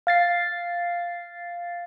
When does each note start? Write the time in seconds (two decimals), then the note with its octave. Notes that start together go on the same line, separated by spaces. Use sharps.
0.07 F5 A6 C7